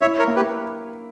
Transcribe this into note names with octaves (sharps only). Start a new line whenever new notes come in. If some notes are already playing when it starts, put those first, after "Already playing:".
E4 C#5 E5
A#4 C#5
A#3
G4 B4